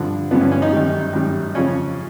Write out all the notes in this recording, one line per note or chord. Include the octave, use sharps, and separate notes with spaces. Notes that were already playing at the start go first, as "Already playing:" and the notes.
Already playing: G2 D3 F3
G2 D3 F3 B3
C#4
C#4
D#4
F#2 D#3 G3
F#2 D#3 G3
F2 C#3 F3 C#4